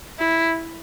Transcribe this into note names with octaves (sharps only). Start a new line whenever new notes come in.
E4